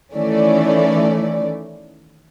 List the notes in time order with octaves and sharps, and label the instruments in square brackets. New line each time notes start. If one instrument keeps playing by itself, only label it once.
[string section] D#3 E3 A3 C#4 D5